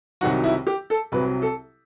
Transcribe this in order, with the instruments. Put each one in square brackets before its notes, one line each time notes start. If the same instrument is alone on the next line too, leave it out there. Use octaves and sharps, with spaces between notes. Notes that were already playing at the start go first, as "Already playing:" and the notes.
[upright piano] C2 C3 D#3 F#3 F#4
E4
G4
A4
C2 C3 F#3 B4
A4